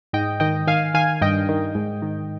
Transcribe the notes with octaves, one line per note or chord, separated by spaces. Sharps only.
G#2 D#5 G5
D#3 D#5 G5
D#3 F5 G#5
D#3 F5 G#5
G2 D#5 G5
D#3
G#2
D#3